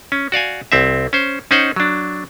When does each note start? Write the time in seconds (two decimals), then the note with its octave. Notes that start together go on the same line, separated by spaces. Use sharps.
0.12 C#4
0.32 F#4 D5 F5 G#5
0.72 C2 C4 E5
1.13 C#4 C5
1.51 C#4 D#4 C5 F#5
1.76 F#3 D4